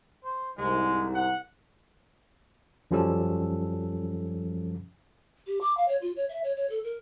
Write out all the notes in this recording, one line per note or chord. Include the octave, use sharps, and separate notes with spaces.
C5
C2 G#2 G#3
F#5
F#2 F3 G3 C#4 A4 E6
G4
D6
F5
C#5
F4
C#5
E5
C#5
C#5
A4
A#4